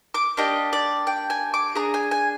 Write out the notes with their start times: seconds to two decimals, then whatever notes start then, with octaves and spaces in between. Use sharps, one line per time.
0.14 D6
0.37 A#3 D4 G4 D#5
0.73 D5
1.07 G5
1.30 G#5
1.54 D6
1.75 D4 G#4 A#5
1.94 G#5
2.11 G#5